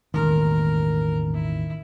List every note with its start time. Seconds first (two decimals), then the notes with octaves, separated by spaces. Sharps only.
0.14 E1 A1 D#2 D#3 A#4
1.34 E4